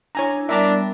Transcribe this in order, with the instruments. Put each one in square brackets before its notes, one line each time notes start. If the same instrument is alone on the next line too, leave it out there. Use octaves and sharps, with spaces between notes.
[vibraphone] D4 E4 [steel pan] C#5 G#5 A#5
[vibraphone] G3 B3 A#4 [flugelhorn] D4 [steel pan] E5 A#5 D6